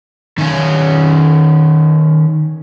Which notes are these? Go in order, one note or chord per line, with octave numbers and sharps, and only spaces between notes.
D#3 C#4